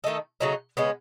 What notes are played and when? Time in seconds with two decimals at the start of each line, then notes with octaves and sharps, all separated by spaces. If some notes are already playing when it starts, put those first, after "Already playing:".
0.04 D#3 A3 D#4 A4
0.40 C#3 F#3 A3 D#4
0.77 C#3 G#3 B3